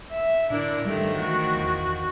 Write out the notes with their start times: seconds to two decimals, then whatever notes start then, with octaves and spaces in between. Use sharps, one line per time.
0.11 E5
0.50 A2 D3 D4 E4 A#4
0.85 G#2 D#3 F3 G3 A3
1.18 E3 A3 F#4
1.56 G1 E2